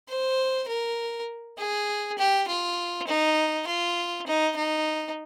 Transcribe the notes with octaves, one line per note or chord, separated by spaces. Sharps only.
C5
A#4
G#4
G4
F4
D#4
F4
D#4
D#4